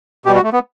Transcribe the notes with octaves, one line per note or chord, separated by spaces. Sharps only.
B2 G3 G4
F#4
A3
B3